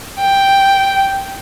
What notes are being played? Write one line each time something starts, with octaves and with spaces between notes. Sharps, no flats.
G5